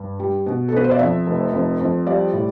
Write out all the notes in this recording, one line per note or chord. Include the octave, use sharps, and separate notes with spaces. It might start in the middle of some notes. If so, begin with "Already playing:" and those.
Already playing: G2
G3
B2
A4
B2 B4
C5
D5
F2 E5
F1
F2
F2
G3 D5
A2